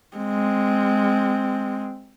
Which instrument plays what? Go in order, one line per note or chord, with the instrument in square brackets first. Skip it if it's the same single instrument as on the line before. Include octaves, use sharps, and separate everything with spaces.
[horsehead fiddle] G#3 C4